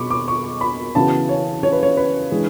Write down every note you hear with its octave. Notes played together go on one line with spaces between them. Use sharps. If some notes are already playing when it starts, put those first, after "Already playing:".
Already playing: B2 G#4 B5 C#6 D6
D6
C#6
B5
C#3 E3 B3 F#4 A5
C#5
C#5
B4
C#5
B4
E3 G#3 D4 G#4